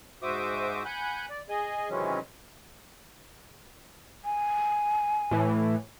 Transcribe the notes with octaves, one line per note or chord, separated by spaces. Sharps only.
G#2 F#4 C5 E5 D6 D#6
F#5 G#5 B5 F#6 G6
D5
G#4 D#5 G#5
C3 D#3 E3 F#3 G#3 C#4
G#5
A2 E3